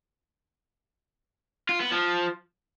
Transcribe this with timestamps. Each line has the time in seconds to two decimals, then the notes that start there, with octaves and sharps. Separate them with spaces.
1.69 F4
1.80 B3
1.92 F3